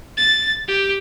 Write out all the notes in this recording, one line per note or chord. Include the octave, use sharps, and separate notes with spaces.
A6
G4